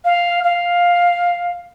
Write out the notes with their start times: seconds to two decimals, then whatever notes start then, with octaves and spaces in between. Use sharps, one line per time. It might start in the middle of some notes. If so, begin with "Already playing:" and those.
0.04 F5
0.44 F5